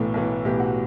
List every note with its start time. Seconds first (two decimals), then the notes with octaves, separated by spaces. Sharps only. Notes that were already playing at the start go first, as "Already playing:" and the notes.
Already playing: B1 A2 E3 A4
0.14 B1 A2 E3
0.45 B1 A2 E3 G4
0.60 F#4